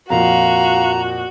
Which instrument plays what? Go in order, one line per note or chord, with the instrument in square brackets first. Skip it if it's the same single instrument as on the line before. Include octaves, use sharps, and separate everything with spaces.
[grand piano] F2 A#2 F3 [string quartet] F#4 [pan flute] F5 [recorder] A#5